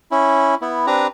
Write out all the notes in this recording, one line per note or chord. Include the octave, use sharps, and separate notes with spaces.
C#4 E4
B3 E4
C4 D4 G4 B4 A#5